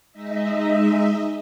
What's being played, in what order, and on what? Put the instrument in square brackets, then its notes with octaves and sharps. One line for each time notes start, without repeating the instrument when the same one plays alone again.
[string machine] G#3 D#4 D#5 E5